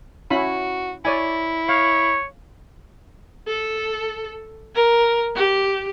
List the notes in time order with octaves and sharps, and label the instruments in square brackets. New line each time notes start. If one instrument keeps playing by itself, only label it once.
[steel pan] C#4 E4 B5 [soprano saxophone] F#4
[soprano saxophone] E4 [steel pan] C#5 D5 G#5
[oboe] C#5 [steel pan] F5
[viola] A4
A#4
G4